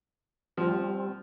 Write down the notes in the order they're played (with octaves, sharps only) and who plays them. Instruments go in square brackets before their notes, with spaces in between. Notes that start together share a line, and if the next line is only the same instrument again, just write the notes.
[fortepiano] F3 [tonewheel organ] G3 C4